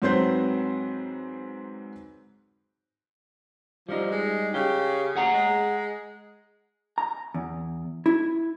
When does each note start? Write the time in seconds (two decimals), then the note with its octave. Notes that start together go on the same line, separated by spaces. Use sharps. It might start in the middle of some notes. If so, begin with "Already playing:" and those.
0.02 G#2 F#3 C4 B4 C5 G6
3.89 F3 G3 D#4
4.11 G#3
4.54 C#3 G4
5.15 G#4 F#5 A#5
5.33 G#3
6.98 A#5
7.34 E2
8.06 E4